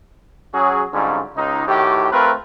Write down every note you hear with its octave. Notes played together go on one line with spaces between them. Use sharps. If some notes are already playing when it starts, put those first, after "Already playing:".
F#3 C#4 F#4 G#4
G#2 D3 F#3 G3 C#4 F4
C#2 C#3 G#3 D#4
A2 D#3 F#4 G4
A3 C4 F4 A#4 B4